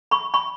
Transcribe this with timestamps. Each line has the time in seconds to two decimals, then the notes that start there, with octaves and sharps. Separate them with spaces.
0.11 B5 C#6
0.34 B5 C#6